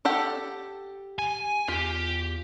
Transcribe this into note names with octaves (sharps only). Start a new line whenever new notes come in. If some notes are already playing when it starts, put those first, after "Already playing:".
G4 A4 F#5
G#5
E2 F4 G4